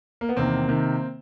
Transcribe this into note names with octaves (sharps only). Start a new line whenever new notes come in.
A#3
B3
E2 C3 D#3 A#3 C4
C3 D#3